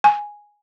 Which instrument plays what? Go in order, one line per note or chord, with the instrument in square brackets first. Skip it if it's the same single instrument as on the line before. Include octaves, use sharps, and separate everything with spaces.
[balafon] G#5